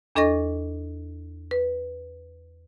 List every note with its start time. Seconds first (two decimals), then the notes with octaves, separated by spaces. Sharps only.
0.15 E2 D4 A4 D#5 C#6 A#6
1.51 B4